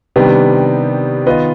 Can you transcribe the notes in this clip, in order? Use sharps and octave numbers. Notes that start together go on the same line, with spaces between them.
C3 D#3 G3 B3 D4
D#3 B3 F4 B4 D#5